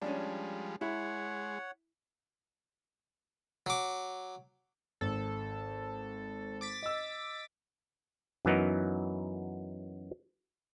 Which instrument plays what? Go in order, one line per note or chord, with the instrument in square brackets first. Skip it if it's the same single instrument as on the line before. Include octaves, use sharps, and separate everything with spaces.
[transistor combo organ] F3 G3 G#3 [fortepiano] C#4 D4
[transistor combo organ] G#3 [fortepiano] E4 [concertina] C#5 F#5
[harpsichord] F#3 D6
[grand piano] G#1 [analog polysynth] A4
[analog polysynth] D6 A6 B6
[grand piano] D#5 E6
[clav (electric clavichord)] F#2 E3 F#3 B3 D#4 A#4